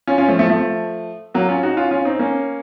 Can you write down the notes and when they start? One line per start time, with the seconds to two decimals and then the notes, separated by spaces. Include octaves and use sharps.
0.07 C#4 F4
0.18 C#4 F4
0.28 F3 A3
0.39 F3 A3
0.50 F3 A3
1.34 F#3 A#3
1.49 C#4 F4
1.63 D#4 F#4
1.77 C#4 F4
1.91 C#4 F4
2.05 C4 D#4
2.19 A#3 C#4